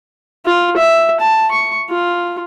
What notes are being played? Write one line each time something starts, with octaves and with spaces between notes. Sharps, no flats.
F4
E5
A5
C#6
F4